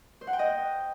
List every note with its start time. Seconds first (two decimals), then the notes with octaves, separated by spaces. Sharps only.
0.21 C5
0.27 F#5
0.33 G5
0.39 D#5